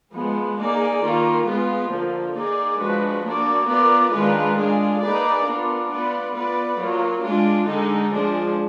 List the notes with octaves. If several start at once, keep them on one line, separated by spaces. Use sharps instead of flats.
F3 G#3 B3
A#3 D#4 G#4 D5
D#3 A#3 F4
G#3 B3 F4
D3 F3 A#3
A#3 D#4 G#4 D5
F3 G#3 D4 F#4 B4
A#3 D4 F#4 D5
B3 F4 A#4 D5
D#3 G#3 D4 F4 B4
G#3 D4 F4 G#4
A#3 D#4 G#4 B4 D5
B3 D4 F4 A#4
B3 F4 B4 D5
B3 F4 B4 D5
F#3 A#3 F4
G#3 D4 F4
D3 G#3 D#4
F3 G#3 D4 G#4